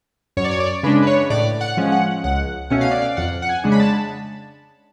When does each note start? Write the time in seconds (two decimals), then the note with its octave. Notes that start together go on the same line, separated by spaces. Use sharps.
0.37 F#2 C#5
0.44 D5
0.51 C#5
0.60 D5
0.83 C#3 G#3 D4 B4
1.02 B4
1.07 C#5
1.30 A2 D5
1.61 F#5
1.77 F3 G#3 C#4
1.92 F#5
2.24 C#2 F#5
2.70 B2 A3 C#4 F#5
2.81 F5
2.91 D5
3.01 F5
3.17 F2 F#5
3.42 F#5
3.49 G#5
3.64 C#3 G#3 D4
3.72 B5
3.80 A5